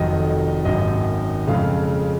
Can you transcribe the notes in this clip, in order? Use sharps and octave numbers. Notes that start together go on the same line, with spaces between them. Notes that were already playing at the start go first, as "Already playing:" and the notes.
Already playing: F1 F2 D#3 F#3 D#5
G#1 F#2 D#3 F#3 D#5
F2 C#3 G#3 F5